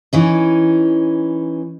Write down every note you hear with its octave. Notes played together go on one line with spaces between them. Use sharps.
E3 C#4 D#4